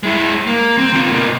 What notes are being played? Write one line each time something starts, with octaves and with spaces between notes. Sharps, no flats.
G#3 E4
A#3
C4
D3 F4
B2 A#3